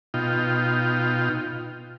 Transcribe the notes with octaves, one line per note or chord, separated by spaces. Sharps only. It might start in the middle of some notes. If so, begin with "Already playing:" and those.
B2 D#4 F4 G5